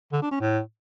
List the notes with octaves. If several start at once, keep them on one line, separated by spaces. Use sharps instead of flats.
D3
D4
C#4
A2